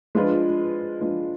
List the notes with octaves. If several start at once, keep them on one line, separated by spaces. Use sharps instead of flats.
F3 G#3 D4 F4 B4
F3 G#3 D4 F4 B4